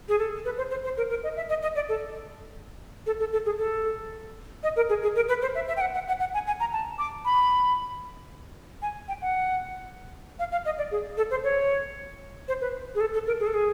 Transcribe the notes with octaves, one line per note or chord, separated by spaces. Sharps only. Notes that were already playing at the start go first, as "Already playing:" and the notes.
G#4
A4
B4
C5
C5
C5
A#4
A#4
D#5
E5
D#5
D#5
D5
A4
A4
A4
A4
G#4
A4
D#5
A#4
G#4
G#4
A#4
B4
C5
E5
E5
G5
F#5
F#5
F#5
F#5
G#5
G#5
A#5
A5
D6
B5
G#5
G5
F#5
F5
F5
D#5
D5
G#4
A4
C5
C#5
C5
B4
G#4
A4
A4
A#4
G#4
A4
G#4